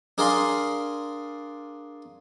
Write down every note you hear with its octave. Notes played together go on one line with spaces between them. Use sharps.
D4 G#4 A#4 D5 F5 C6